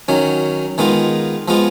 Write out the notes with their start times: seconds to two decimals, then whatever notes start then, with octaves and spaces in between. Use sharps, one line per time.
0.08 D#3 F#3 C#4
0.78 D#3 G#3 B3 F4
1.48 F3 G#3 B3 F4